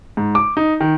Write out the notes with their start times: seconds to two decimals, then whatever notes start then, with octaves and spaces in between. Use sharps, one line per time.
0.17 G#2
0.35 D6
0.57 D#4
0.80 D#3